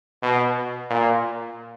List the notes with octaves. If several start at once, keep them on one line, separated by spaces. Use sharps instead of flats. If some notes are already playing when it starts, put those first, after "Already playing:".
B2
A#2